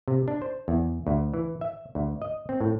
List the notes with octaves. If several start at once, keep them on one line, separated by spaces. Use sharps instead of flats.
C3
D4
C5
E2
D2
E3
E5
D2
D#5
C4
A2